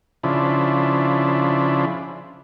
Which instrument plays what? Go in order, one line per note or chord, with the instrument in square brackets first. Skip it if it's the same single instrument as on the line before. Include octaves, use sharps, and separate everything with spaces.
[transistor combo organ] C#3 F3 D4 E4